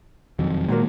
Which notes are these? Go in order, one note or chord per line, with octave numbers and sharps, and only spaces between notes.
E1 F2 D#3 F#3
A#2 D#3 F#3 G#3 A#3